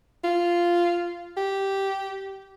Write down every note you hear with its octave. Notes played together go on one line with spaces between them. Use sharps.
F4
G4